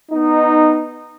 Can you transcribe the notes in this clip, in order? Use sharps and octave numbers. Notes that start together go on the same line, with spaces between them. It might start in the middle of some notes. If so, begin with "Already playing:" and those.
B3 D#4